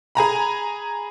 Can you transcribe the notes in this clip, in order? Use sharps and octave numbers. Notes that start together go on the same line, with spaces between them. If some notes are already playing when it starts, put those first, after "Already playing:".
G#4 G#5 A#5 B5